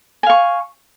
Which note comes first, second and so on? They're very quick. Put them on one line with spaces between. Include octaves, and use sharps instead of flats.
G#5 F5 C#6